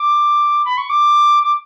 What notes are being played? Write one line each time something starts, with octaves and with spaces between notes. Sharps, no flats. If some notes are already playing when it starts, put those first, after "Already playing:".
Already playing: D6
B5
C#6
D6
D6